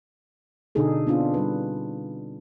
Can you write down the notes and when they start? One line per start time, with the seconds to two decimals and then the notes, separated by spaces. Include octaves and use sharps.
0.75 B2 D3 D4 D#4 G#4 A4
1.07 B3 C4 D4 F4
1.34 G3 B4